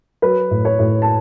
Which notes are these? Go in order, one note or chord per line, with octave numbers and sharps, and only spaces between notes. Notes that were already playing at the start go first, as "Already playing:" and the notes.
F#3 B4
A2
C#5
A2
A5